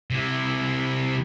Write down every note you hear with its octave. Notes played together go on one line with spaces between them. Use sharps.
C3 E4